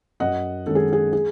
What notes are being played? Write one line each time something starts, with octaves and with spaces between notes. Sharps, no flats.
F#2 D#5 F#5
D#3 G#3 C#4 A4
G#4
G#4
G#4